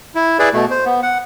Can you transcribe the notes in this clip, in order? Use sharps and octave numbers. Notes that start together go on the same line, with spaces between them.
E4
E4 G#4 B4 D5
B2 A3
C5
B3
F#5